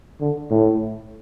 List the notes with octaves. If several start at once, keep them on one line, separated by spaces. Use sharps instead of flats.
D3
A2